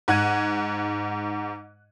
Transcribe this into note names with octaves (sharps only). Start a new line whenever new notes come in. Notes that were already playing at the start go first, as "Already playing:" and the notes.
G#2 F#5 F#6 G#6 D#7